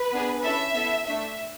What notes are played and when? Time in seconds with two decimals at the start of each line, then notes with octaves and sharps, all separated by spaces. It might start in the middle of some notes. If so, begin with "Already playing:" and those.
Already playing: B4
0.12 B3 D4 G#4
0.43 C#4 E4 A4 E5
0.74 B3 E4 A4
1.05 A3 D4 A4 E5